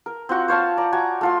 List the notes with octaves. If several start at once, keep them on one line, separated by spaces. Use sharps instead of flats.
A#4
C4 F4 F#4
C5 C#5 F5 A5
D5 A#5
F#4 G#5 A#5
A3 F4 C6